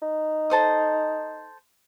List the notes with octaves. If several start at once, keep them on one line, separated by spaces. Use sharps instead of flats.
D#4
A4 C5 D#6